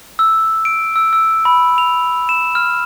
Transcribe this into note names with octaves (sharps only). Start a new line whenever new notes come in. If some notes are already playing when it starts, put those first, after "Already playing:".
E6
D7
E6
E6
B5
F7
E7
F6